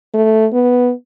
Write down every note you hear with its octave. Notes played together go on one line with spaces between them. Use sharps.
A3
B3